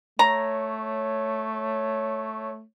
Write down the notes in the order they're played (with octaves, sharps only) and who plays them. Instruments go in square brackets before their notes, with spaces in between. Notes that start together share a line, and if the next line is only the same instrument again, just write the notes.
[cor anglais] A3 [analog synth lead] C#5 [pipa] A#5